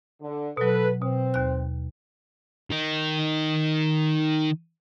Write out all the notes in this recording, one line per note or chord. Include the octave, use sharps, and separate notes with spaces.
D3
B2 F#3 A4 B4
B2 C4
D#2 F#6
D#3 D#4